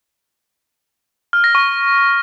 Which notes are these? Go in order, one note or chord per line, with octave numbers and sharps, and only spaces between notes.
F6
A#6
C#6